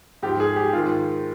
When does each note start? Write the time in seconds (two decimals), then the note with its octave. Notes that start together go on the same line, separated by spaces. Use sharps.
0.23 G#2 F3 G4
0.40 G#4
0.56 G4
0.73 G#2 D#3 F4